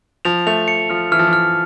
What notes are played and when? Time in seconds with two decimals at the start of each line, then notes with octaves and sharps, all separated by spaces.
0.25 F3 F7
0.47 A3 F7
0.68 C#7
0.90 F3 F6
1.12 E3 F6
1.19 F3
1.27 E3
1.33 F6